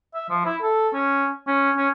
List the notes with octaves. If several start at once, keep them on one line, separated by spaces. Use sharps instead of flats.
E5
F3
E4
A4
C#4
C#4
C#4